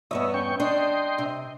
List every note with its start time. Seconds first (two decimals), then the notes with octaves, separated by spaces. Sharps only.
0.11 E2 G2 B3 C#5 D#5 E5
0.34 C#4 G5 C#6
0.60 D4 D#5 G5 C6
1.18 C3